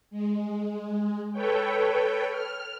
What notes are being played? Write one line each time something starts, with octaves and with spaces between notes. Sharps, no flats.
G#3
A4 B4 C#5 G5
F6